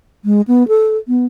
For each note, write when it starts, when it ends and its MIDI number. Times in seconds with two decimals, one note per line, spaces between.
0.25 0.41 56
0.48 0.66 59
0.68 0.97 69
1.08 1.26 59